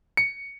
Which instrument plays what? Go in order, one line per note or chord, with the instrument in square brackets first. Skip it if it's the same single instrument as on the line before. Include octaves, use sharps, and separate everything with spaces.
[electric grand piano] C#7